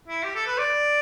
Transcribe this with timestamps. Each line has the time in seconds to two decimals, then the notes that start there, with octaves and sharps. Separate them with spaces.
0.08 E4
0.23 G4
0.35 A4
0.47 B4
0.58 D5